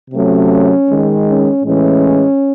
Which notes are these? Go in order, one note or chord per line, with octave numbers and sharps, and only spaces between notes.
C3 F#3 A3 C#4
D#3 G#3
C#4
A2 E3 G#3 C#4